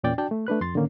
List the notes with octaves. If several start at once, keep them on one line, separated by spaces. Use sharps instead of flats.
E2 A#2 C#4 D5 G5 A6
D4 F#4 D5 G5 A5
A3
A3 D4 B4 F#6
F2 C6 A6
A2 D3 D#3 A#3 C#4